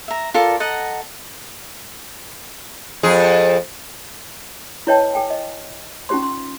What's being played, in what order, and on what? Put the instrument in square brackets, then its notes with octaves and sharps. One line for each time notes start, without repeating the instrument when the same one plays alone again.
[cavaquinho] E5 A#5
F4 A4 A#4 D5
A4 D#5 F#5 A#5
[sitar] F2 G#4
[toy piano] E4 B4 C#5 D#5 G5 A5
A4 G5 G#5
D#5
C#4 D#4 F4 G4 C5 C6
C6